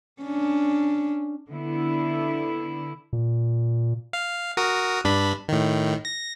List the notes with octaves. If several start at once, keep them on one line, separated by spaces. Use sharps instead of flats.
C#4 D4
D3 B3 E4
A#2
F5
F#4 A#4 D#6
G2 D4 B5
A2 D#3
A#6